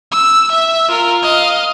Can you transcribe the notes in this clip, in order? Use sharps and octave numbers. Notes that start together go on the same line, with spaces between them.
E6
E5
F4 A#4
D#5 F5